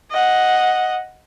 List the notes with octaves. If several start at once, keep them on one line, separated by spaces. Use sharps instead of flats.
D#5 F#5